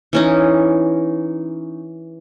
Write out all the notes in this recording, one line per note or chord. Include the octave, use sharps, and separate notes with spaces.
E3 C#4 D#4